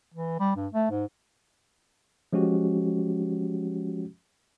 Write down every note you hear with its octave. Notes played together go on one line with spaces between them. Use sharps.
E3
G3
G2
A3
G#2
F3 G#3 C#4 F#4 G4